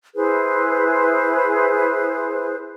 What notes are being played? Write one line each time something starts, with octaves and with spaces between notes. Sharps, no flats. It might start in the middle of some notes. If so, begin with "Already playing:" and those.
E4 G#4 B4 C5